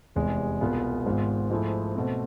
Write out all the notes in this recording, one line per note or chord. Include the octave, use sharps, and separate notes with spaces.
F1 E2 C3 G#3
C2 B2 B3 F4 G#4
G#1 G#2 G#3 B3 F4
G#2 F3 A3 E4 G#4
B2 A3 C4